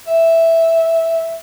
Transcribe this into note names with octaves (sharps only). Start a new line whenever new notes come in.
E5